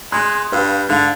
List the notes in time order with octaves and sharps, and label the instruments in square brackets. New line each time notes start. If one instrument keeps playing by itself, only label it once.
[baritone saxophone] G#3 [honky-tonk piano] C6 D#6 F#6
[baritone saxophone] G2 [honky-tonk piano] B4 F5 B5
[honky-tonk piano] G#2 F5 F7 [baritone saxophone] D3